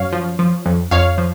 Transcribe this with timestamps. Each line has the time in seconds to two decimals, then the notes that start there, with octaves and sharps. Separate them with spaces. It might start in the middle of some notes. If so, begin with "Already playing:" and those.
Already playing: F#2 C#5 F5
0.13 F3
0.39 F3
0.65 F2
0.91 F2 C#5 F5
1.18 F3